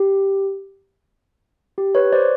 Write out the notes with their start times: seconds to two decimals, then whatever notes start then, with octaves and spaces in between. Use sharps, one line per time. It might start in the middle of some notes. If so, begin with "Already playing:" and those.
Already playing: G4
1.78 G4
1.95 B4 C#5
2.12 C5 D5